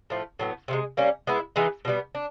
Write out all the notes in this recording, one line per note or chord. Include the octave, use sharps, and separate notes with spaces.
A2 F3 A3
A2 F#3 B3
C3 D#3 G#3
G3 A#3 C#4
G#3 B3 E4
E3 G#3 B3 D#4
B2 G3 B3
D4